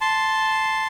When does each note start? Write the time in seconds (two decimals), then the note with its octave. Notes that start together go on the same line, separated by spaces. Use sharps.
0.01 A5 C6